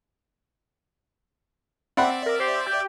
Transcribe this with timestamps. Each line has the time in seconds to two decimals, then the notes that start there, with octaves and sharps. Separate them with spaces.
1.97 C4 D5 E5 F#5 B5
2.26 A#4
2.40 G4 C5
2.66 G4 G5